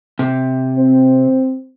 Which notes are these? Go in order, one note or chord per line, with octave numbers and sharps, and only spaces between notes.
C3
C4